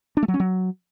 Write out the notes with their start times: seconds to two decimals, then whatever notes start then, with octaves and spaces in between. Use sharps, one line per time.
0.17 D4
0.23 A3
0.28 F#3
0.34 C#4
0.40 F#3